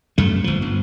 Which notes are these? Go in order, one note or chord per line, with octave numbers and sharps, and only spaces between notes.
F#2 A3
G1 F3
G1